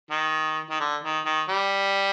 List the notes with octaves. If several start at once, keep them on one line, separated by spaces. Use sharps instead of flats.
D#3
D#3
D3
D#3
D#3
G3